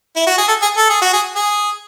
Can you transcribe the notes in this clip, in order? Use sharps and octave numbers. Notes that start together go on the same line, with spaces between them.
E4
F#4
G#4
A4
G#4
A4
G#4
F#4
G#4
G#4